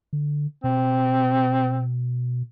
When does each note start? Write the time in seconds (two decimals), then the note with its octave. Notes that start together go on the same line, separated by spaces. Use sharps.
0.13 D3
0.64 B2 C4